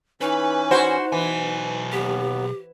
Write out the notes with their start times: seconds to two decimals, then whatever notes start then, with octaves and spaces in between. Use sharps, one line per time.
0.21 E3 C#4 D#4 B4
0.71 E4 F#4 C5
1.12 B1 B2 E3 G#5
1.92 D#2 B3 G4